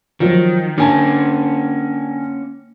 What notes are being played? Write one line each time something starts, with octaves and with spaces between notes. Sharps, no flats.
D#3 F3 F#3
D3 A#3 C#4 G#5 A5